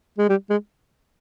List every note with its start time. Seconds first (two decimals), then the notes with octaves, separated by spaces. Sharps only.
0.18 G#3
0.29 G3
0.50 G#3